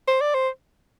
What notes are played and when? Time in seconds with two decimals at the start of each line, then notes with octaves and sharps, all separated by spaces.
0.08 C5
0.21 D5
0.34 C5